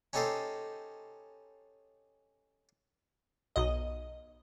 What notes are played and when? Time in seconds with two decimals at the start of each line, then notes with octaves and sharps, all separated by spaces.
0.13 C#4 D#4 G4 A4 C5 D#5
3.56 B1 D#5